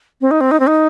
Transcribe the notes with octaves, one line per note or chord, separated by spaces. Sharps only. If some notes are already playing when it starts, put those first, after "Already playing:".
C4
D#4
C4
D#4
C4
D#4